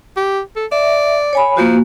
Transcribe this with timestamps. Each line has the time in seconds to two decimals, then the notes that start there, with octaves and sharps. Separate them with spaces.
0.16 G4
0.56 A4
0.72 D5 E5
1.33 C#5 G#5 B5
1.57 F3 A#3 F#4